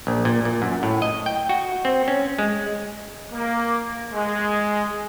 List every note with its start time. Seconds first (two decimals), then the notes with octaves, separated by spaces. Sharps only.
0.07 A#1
0.25 A#2
0.45 A#2
0.62 F#2
0.83 A2
1.02 D#5
1.26 G5
1.49 F#4
1.85 C4
2.08 C#4
2.39 G#3
3.32 A#3
4.13 G#3